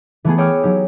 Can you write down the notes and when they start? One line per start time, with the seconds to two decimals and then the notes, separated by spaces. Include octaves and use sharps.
0.25 E3 A3 B3 G#4
0.38 G#4 C#5 G5 D6 E6 F6
0.63 F#3 D#4 G4